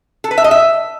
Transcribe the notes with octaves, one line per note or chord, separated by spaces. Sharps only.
A4
B4
E5
D#5
E5